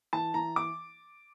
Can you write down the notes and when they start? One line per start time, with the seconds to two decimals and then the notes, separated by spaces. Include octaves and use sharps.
0.13 E3 A5
0.34 E3 A#5
0.56 D6